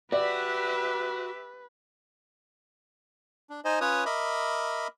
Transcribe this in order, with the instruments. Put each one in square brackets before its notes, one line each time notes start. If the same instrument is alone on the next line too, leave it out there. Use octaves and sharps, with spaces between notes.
[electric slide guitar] F#4 [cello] G4 E5 [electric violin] B4 [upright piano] D5
[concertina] D4
D#4 C5 D#5 G#5
C#4 F4 B4 C#5 D#6
A#4 D#5 E5 B5 D6